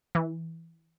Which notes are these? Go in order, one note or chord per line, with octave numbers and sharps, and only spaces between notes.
E3